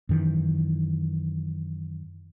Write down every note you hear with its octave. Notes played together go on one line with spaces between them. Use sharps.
F#2 D#3 E3